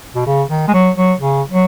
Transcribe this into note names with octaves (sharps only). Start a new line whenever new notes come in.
B2
C#3
D#3
G#3
F#3
F#3
C#3
F#3